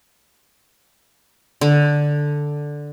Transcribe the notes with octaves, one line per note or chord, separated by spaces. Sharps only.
D3